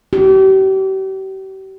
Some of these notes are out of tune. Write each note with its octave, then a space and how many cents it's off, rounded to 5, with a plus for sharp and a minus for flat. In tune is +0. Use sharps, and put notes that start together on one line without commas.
G4 -40